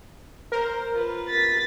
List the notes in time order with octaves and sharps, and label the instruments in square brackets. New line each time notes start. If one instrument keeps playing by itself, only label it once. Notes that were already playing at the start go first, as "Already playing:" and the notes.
[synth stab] A#4 [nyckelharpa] C5
[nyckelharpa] F4 B4
[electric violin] A6 B6